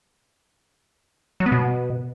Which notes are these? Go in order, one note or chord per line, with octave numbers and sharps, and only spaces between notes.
F#3
B3
B2